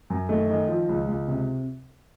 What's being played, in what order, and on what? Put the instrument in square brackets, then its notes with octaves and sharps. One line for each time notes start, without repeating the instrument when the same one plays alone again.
[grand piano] F#2
D#3 A3
D#3
F3
C#2
C#2
C3